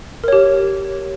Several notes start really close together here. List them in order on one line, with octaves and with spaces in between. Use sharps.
A#4 C#5 G4